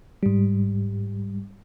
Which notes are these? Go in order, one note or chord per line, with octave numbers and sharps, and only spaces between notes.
G#2 G3